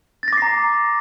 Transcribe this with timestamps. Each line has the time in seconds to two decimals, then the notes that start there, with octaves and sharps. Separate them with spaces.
0.23 A6
0.28 A#6
0.33 D6
0.37 C7
0.42 A#5